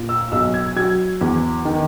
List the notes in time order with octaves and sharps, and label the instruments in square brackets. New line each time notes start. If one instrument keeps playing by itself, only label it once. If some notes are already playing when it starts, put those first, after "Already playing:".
Already playing: [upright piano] A#2
E6
B1 E6
G#6
F#3 G#6
E2
D#3